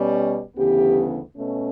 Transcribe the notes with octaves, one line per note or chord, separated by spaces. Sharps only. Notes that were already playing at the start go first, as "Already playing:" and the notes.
Already playing: B2 G3 C#4
D2 C#3 E3 B3 G4
B2 A3 C#4